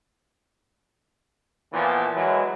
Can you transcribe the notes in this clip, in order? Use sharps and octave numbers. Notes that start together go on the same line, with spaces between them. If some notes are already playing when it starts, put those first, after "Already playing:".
A#2 E3 F3 B3
E3 F#3 G#3